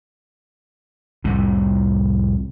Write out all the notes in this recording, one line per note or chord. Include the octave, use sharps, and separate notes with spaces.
C2 F2 A2